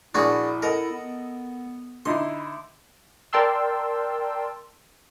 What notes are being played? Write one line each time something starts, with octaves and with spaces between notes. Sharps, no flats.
A#1 D4 E4 F#4 G#4 C#6
A4 A#4 D#5 F#5
B3
D3 D#4 E4 C6
A#4 D5 G5 A5 C6 E6